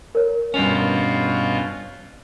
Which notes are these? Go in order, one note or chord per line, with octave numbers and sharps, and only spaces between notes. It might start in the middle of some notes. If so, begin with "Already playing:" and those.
A#4 C#5
G2 B2 C#4 F4 F7